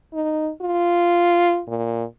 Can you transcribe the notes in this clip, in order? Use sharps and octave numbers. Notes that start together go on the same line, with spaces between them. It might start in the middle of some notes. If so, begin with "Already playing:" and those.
D#4
F4
A#2